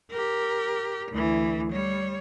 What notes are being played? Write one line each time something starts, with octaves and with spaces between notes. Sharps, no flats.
G4 A#4
D2 E3
G3 C#5